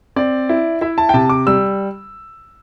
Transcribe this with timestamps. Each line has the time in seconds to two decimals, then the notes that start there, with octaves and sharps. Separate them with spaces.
0.16 C4 D5
0.49 E4
0.81 E4 E5
0.98 A5
1.09 G5
1.14 C3 A5
1.30 D6
1.47 G3 E6